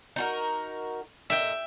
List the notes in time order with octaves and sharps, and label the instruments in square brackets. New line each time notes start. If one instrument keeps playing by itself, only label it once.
[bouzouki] D#4 F#4 A#4
[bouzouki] A#2 D#5 [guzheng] E5 G5